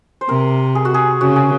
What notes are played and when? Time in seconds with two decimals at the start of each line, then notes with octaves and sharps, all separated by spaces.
0.21 C5
0.29 C3 A#4
0.75 G#4
0.85 F#4
0.94 G#4
1.21 C#3 F#4
1.36 G#4